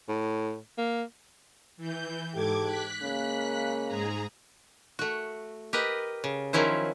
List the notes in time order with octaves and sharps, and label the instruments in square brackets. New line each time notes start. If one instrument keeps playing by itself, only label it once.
[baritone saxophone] A2
A#3
[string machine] E3 G6
[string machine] G#2 D6 G#6 [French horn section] G4 A4
[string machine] F#6 B6
[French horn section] C#3 G#3 A#3
[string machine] G#2 G#4 A#5
[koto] A3 F#4
G4 A#4 B4 D#5
C#3
D#3 F3 F#3 C#4 E4 C5